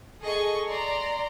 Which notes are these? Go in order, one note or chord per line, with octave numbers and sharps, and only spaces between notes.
G#4 A4 D#5 C#6
D5 A#5 C6